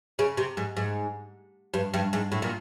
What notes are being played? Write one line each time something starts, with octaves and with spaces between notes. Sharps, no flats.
C#3
C3
G#2
G#2
G2
G2
G#2
A2
A#2